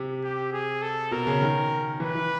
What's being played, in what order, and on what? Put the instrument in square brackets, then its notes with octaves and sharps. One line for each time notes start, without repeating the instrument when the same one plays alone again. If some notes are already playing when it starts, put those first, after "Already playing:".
Already playing: [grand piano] C3
[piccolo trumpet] G4
G#4
A4
[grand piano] B2 [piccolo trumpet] A#4
[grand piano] C#3
D#3
[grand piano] E3 [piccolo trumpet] B4
[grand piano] E3